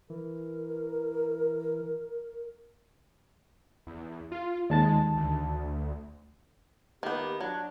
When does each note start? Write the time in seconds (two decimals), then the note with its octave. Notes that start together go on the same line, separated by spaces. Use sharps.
0.10 E3 A#4
3.87 E2
4.32 F4
4.70 D#2 G#3 A5 A6
5.17 D2
7.03 D#3 A#3 B3 G4
7.41 F#3 D4